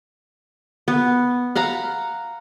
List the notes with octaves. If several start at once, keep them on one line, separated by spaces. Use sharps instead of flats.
B3
F5 F#5 A#5 B5